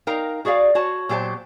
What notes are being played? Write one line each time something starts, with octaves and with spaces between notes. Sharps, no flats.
D#4 A#4 F5 G5 A#5
F#4 G#4 D5 E5 F5
F#4 C#5 A5
A#2 F#3 G4 C5 A5